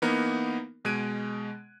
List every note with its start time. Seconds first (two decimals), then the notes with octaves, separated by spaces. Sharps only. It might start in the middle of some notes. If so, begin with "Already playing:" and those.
0.02 E3 A#3 B3 D#4 A#4
0.85 B2 G#3 F#6 G#6 D7 D#7